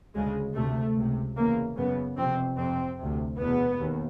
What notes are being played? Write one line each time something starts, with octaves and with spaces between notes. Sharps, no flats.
D2 C#3 G#3
D2 C3 A3
C#2 C3
E2 C#3 A#3
F#2 C#3 B3
F2 C3 C4
F2 C3 C4
D2 C3
E2 B2 B3
D#2